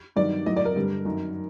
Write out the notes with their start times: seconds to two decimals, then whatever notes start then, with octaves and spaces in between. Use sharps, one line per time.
0.16 G2 D#3 F#3 D5
0.46 A2 F#3 D#5
0.57 D5
0.65 A#4
0.76 G2 D3 G3
1.05 F#2 D#3 F#3